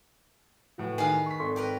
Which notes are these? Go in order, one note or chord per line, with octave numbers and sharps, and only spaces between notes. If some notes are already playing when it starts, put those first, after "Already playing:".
A2 E3 F#4
D#3 G#4 B4 F5
C#6 B6
G#1 A4 C6 C#6
G4 A#4 B4